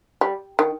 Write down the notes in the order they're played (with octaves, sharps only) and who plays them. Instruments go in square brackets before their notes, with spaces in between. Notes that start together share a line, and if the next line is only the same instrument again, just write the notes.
[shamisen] G3
D#3